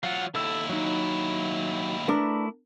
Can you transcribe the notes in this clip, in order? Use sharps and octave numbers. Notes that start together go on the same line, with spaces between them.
F#3 F4 F5 F#5
D#2 E4 A4 E6
F#3 D#4
A3 B3 D4 E4 A#4 D6